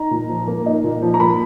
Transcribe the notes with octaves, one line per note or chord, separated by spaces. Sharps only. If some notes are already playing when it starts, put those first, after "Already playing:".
Already playing: D#4 A#5
A#2
F3
A#3
D#4
A#2
F3
A#5
A#3 B5